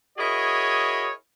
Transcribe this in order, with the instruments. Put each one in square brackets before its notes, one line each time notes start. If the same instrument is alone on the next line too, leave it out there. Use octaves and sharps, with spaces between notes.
[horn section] E4 F#4 G#4 A#4 C#5 D#5